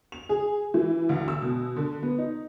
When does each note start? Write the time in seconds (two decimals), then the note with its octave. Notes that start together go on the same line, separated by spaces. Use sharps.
0.12 F7
0.29 G#4
0.74 E3
1.09 D2
1.28 E6
1.42 B2
1.76 D3
2.03 B3
2.18 D#4